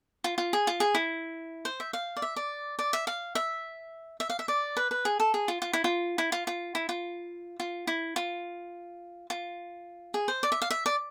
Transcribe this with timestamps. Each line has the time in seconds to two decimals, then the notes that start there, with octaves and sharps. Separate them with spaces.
0.24 F4
0.38 F4
0.53 G#4
0.67 F4
0.80 G#4
0.95 E4
1.65 C5
1.80 E5
1.93 F5
2.17 D5
2.22 E5
2.36 D5
2.79 D5
2.93 E5
3.07 F5
3.35 E5
4.20 E5
4.30 F5
4.39 E5
4.48 D5
4.77 B4
4.91 B4
5.05 G#4
5.20 A4
5.34 G#4
5.48 F4
5.62 F4
5.73 E4
5.84 F4
6.18 E4
6.32 F4
6.47 F4
6.75 E4
6.89 F4
7.60 F4
7.87 E4
8.16 F4
9.30 F4
10.14 G#4
10.28 C5
10.43 D5
10.52 E5
10.62 F5
10.70 E5
10.86 D5